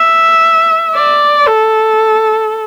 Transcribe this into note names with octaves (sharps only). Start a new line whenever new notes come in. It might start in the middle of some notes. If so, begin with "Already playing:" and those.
Already playing: E5
D5
A4